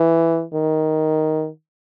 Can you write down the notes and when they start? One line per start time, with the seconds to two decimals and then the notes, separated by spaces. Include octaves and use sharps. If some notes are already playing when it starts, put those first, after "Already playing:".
Already playing: E3
0.54 D#3